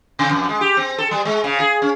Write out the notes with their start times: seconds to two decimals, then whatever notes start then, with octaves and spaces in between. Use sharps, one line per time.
0.19 C3
0.31 F2
0.49 G#3
0.61 G4
0.77 C4
0.98 A4
1.11 G3
1.25 G#3
1.44 C#3
1.60 G#4
1.82 C#4